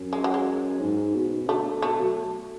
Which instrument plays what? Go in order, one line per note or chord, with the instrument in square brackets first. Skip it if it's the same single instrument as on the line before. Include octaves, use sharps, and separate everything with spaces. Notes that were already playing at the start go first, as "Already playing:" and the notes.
Already playing: [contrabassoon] F#2
[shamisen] G#3
F#3
G#3
[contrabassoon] G#2
B2
[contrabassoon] D3 [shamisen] A3
[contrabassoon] B2 [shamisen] A3
[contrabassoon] F#3